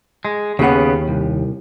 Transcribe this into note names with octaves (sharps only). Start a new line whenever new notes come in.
G#3
D#2 C#3 B3 G#4 F#5
C2